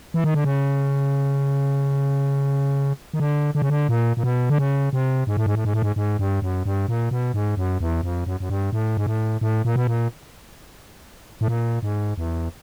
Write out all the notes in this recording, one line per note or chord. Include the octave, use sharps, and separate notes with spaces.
E3
D#3
D3
C#3
D#3
D3
D3
C#3
D3
A#2
A#2
B2
D3
C#3
C3
G#2
A2
G#2
A2
G#2
A2
G#2
G#2
G2
F#2
G2
A#2
B2
G#2
F#2
E2
F2
F#2
F#2
G2
A2
G#2
A2
A2
A#2
B2
A#2
A2
A#2
G#2
E2